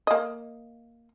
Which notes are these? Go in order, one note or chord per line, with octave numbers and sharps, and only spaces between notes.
A#3 D#5